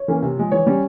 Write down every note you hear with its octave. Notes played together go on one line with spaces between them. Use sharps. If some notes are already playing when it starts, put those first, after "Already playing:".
Already playing: C#5
E3 A#3 C#4
C3
F3 G#3
E3 C#5
G3 C#4